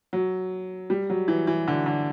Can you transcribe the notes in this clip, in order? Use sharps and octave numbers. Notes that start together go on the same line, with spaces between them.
F#3
G3
F#3
E3
E3
D3
D3